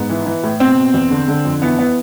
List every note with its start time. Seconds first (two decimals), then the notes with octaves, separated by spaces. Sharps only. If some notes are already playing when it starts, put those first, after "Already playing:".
Already playing: G#2 B3
0.09 E3
0.26 E3
0.44 A2
0.60 B2 C4
0.77 B2
0.94 E2
1.10 D3
1.28 D3
1.45 F2
1.62 E3 B3
1.78 E3 B3